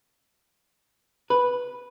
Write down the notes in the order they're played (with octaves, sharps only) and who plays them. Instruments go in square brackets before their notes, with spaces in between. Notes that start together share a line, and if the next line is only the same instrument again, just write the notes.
[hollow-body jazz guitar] B4